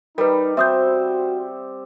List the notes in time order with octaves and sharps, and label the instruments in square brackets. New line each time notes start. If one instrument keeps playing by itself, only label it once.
[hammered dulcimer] G3 [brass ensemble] D#4 [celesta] A#4 B4
[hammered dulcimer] C4 [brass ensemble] F#4 C5 [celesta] E5 D#6 G6